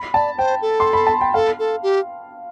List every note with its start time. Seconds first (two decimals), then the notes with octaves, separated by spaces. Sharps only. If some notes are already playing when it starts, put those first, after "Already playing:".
Already playing: B5
0.14 D5 A5
0.38 C5 G5
0.62 A4
0.80 C6
0.93 B5
1.07 A5
1.21 G5
1.34 A4 F5
1.59 A4
1.83 G4